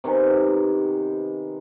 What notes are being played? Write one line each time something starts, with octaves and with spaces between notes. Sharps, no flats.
C3 D#3 B3 G#5